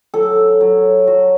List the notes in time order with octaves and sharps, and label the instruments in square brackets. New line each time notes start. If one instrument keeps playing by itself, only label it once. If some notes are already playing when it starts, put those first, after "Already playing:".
[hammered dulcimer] F#3 A4
F#3
F#3 F#4